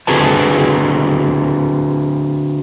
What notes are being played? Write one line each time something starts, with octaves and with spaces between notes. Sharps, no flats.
D3 C4 F#4 G#4 B4 A5